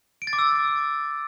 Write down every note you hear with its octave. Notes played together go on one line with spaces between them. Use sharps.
D7
A6
D6
E6